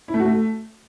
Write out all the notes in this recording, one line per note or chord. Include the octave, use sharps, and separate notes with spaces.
E4
A3
F#4
A3